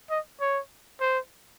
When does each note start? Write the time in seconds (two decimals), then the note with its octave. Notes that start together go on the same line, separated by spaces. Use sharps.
0.10 D#5
0.41 C#5
1.01 C5